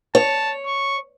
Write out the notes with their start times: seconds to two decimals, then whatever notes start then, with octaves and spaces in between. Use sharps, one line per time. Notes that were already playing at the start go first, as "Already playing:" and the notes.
0.15 C#5 A5
0.66 C#6